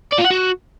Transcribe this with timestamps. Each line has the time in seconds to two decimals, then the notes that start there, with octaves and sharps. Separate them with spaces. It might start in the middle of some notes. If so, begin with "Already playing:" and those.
0.12 D5
0.18 F4
0.24 F#5
0.31 F#4